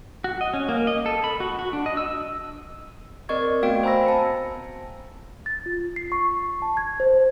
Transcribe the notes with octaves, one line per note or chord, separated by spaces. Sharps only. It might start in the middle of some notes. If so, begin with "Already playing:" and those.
F#4
D#5
C#4
A#3
D#5
A4
B5
F#4
F#4
D4
D#5
E6
C4 A#4 D5 D#5 C#6 G#6
A3 B3 F#4 F5 G5 D7
C5 G#5 A#5 B5 E6 A#6
C4 A5 C#7
A6
F4
C7
C#6
A5
G#6
C5